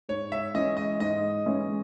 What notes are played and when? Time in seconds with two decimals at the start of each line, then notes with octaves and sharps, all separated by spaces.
0.09 G#2 C#5
0.32 E5
0.54 E3 G#3 C#4 E4 D#5
0.77 D#5
1.00 G#2 D#5
1.46 E3 G#3 C#4 E4